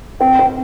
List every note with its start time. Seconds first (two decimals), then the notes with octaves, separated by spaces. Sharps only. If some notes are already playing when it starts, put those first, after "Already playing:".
0.20 C4 G5
0.39 C4